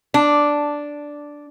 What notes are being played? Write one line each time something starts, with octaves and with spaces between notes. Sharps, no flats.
D4